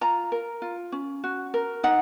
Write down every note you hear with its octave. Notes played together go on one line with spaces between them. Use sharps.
F4 A#5
A#4
F4
C#4
F#4
A#4
D#4 F#5